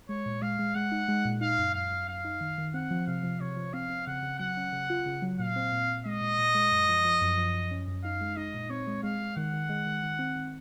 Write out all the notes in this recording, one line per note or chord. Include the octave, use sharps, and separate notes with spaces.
G#3 C#5
A#2
G#3 F5
G#3
G#3 F#5
D#4
G#3
A#2
D#4 F5
F#2
F#2 F5
F#2
F#2 F5
D#4
D#3
D#3
C4 F#5
F3
C3 F5
F3
C3 C#5
F3
C4 F5
C4
C#3 F#5
C#3
F#3 F#5
C#4
C#3
F4
C#3
F#3
A#2 F5
C4
A#2
A#2
G#3 D#5
A#2
A#2
G#3
F#2
F3
F3
F#2
F3
F#2
C#4
F#2
D#4 F5
G#3
D#4 D#5
A#2
C4 C#5
G#3
G#3 F5
G#3
D#3 F#5
D#3
G#3
D#3
D#3
C4
D#3